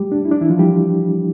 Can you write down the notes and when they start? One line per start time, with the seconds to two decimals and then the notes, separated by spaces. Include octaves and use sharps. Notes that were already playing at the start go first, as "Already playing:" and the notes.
Already playing: G3 A3 G4
0.12 D4
0.25 E4
0.31 D4
0.41 E3 E4
0.50 F3 F4
0.59 G3 G4